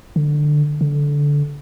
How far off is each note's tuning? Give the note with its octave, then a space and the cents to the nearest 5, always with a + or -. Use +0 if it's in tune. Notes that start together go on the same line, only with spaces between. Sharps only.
D3 +15
D3 -15